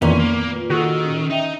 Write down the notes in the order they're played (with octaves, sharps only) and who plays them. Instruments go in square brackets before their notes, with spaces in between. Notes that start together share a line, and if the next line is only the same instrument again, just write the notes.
[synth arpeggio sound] F2 D#3 E3 [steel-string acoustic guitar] A#2 [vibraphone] B3 [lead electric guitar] C#4
[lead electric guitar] A#3
[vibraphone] F4 B4
[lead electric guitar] D#3 [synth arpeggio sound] F#4 [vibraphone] G#4 A4 E6
[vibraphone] C#4
[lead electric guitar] D#4 [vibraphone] E5 G5